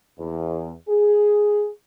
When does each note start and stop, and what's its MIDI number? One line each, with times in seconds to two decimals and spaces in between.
0.19 0.73 40
0.88 1.68 68